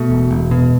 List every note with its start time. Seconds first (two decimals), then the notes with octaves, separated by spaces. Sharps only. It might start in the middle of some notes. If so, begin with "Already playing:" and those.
Already playing: B2 A3
0.10 E1
0.31 E1
0.51 B2